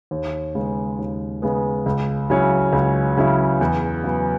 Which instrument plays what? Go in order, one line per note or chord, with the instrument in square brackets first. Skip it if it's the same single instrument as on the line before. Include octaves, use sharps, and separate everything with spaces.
[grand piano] D#2
C#3 G#3 B3
D#2
C#3 G#3 B3
C#2
C#3 F#3 C#4 E4
C#2
C#3 F#3 C#4 E4
E2
C#3 F#3 B3